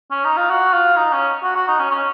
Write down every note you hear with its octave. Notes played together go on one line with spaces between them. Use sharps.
C#4
D#4
F4
F#4
F4
D#4
C#4
F#4
F#4
D#4
C#4
C#4